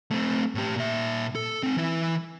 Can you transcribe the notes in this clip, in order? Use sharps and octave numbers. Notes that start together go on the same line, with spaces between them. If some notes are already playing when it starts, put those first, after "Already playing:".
A3 C4
A2 G4
A#2 E5
A4
C4 D#4
E3 E4